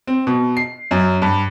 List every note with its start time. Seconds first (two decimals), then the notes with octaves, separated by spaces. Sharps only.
0.07 C4
0.27 B2
0.57 C7
0.91 F#2
1.22 G2